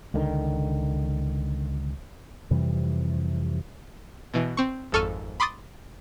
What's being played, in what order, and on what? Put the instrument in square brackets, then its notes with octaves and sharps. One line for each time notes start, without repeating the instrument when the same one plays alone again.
[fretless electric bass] C#2 D3 D#3
[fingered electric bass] F2 C3 E3 G3
[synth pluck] B2 E3
C4 C#6
G#1 F2 A4 C#6 F6 D#7
B5 C6 D6 D#6 A6